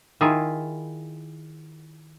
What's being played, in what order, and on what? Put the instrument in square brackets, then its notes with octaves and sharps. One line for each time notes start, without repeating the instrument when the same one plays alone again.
[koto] D#3 E4 F4 G#4